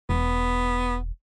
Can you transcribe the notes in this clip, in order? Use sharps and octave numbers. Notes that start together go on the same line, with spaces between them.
E1 B3